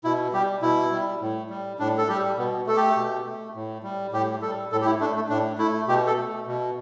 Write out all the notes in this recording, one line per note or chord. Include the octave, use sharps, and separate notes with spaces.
B2 E4
G3 G4
B2 E4
G3
A2
G3
A2 D4
A4
G3 G4
B2 B3
A3 A4
G4
B2
A3
A2
G3
A2 G4
G3 A4
A2 A4
G4
E4
A3 D4
A3
A2 D4
A3 E4
B2 G4
A4
A3
B2